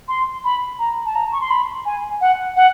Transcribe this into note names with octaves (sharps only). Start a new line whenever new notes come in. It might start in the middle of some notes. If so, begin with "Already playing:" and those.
C6
B5
A#5
A5
A#5
C#6
C6
B5
G#5
F#5
F#5